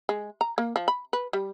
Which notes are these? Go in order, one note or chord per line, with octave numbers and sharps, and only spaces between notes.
G#3
A#5
A#3
F3
B5
B4
G3